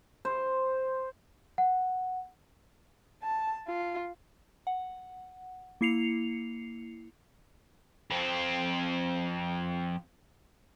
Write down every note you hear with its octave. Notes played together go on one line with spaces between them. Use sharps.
C5
F#5
A5
F4
F#5
A#3 E4 C7 C#7 F7
F2 C4